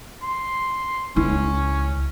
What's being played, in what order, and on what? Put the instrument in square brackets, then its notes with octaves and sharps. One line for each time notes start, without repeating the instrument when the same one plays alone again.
[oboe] C6
[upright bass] C#2 E4 [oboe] C#4